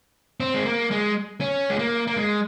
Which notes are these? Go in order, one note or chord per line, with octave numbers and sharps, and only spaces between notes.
C4
G#3
A#3
G#3
C#4
G#3
A#3
A#3
G#3